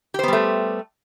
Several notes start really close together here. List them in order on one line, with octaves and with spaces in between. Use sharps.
G4 C5 B3 G3 A3